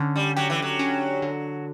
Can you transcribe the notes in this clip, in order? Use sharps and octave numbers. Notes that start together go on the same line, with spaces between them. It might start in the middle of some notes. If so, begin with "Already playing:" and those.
Already playing: D3 C#4
G3
F#3 G4
E3
F#3
C#4
D3